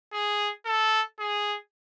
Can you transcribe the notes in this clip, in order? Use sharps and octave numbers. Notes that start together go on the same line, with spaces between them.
G#4
A4
G#4